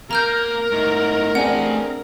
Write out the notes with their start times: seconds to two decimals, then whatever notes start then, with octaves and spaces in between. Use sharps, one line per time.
0.11 A#3 A#4 A#5 F6 G6
0.72 G#2 A3
1.35 A3 C4 D4 G#4 F#5 G#5